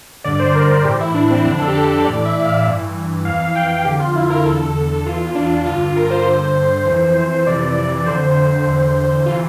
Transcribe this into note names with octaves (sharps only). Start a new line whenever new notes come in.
G2 D3 D5
C5
A#4
A#4
A2 E3 G4
E4
D4
C4
F2 D3 D4
A4
G4
A4
G4
A2 E3 D5
E5
F5
G2
E3
F2 E3 F5
F5
G5
F5
F2 D3 G4
F4
E4
A#4
E2 D3 A4
E2 E3 F4
D4
D4
G2 D3 F4
A#4
C5
G2 D3
F2 E3
F2 C3 E3 D5
F2 D3 C5
E2 D3
C3 E3 F4